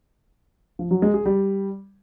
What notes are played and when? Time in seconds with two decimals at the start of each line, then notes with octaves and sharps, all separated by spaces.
0.79 F3
0.91 F#3
1.02 G#3
1.14 G#4
1.25 G3